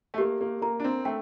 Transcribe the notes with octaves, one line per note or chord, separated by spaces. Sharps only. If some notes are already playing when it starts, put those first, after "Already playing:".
A3
A#3 G4
A#3
A#3 A#5
D4
C4
A3 G5